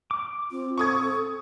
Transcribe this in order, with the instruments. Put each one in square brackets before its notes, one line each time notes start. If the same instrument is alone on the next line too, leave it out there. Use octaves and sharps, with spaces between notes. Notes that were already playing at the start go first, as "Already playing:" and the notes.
[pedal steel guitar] D6
[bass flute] C4 [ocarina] F4
[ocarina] A4 [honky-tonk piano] C#6 D#6 G#6